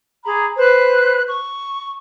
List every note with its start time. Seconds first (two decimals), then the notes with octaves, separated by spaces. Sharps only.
0.24 G#4 A#5 B5 D6
0.57 B4 C5 F#6
1.27 C#6